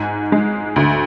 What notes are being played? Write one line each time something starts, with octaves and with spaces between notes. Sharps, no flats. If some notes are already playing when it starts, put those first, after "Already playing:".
Already playing: G#2 G#5
G#3
D2